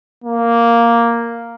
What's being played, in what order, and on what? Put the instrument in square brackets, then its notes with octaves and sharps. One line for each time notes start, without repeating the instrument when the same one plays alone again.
[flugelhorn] A#3